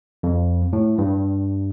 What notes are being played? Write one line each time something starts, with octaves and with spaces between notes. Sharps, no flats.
F2
A2
G2